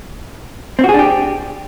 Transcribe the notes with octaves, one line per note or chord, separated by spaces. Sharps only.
C4
F#4
G#4
D4
G4